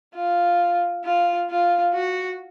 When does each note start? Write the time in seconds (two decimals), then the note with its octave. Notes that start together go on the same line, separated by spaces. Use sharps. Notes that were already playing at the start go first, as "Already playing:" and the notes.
0.15 F4
1.05 F4
1.50 F4
1.94 F#4